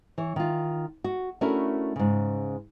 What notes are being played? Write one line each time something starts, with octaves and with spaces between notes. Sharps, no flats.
E3 C#5
D#3 F4
F#4
A3 C#4 D4 E4 F#4 A#4
G#2 C#3